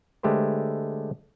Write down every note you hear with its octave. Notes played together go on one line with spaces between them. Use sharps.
D3 G#3 A3 G4 B4 C5